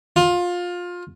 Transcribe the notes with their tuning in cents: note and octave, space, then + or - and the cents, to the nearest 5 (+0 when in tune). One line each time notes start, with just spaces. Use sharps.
F4 +20